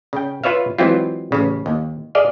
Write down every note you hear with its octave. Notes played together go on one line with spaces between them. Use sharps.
C#3 G5
F4 B4 C#5 E5 F5
E3 F#3 G#3 C4 E4 F4
A1 C#3
D#2
G#4 D5 D#5 F5